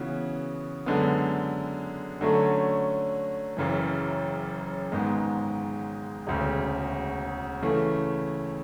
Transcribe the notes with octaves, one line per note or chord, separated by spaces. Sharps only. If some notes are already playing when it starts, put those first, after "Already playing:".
Already playing: C#3 E3 B3 F#4
F#2 D3 G#3 B3
D3 F#3 A3 C#4
F#1 F#2 C#3 E3
G#1 G#2 G#3 B3
E1 D2 C#3
C#3 E3 A3